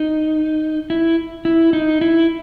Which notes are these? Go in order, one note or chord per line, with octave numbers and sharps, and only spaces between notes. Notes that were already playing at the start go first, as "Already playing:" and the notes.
Already playing: D#4
E4
E4
D#4
E4